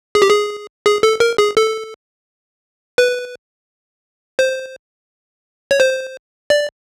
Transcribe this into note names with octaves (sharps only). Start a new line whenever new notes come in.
G#4
G4
G#4
G#4
A4
A#4
G#4
A4
B4
C5
C#5
C5
D5